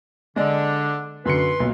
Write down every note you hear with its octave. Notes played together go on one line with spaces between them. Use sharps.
D3 G#3 D4 D5
F#2 D3 B4 C6 C#7
B1 A#2